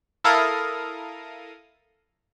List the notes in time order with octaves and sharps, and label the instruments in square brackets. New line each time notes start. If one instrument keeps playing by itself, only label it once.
[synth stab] E4 A4 A#4 F5 A#5 D#6